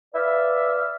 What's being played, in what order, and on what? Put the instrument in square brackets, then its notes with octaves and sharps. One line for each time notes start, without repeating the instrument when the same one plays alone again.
[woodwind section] B4 D5 E5 F5